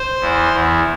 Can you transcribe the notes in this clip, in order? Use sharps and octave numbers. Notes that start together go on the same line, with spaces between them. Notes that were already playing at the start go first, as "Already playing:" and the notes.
Already playing: C5
E2 E3
E2 E3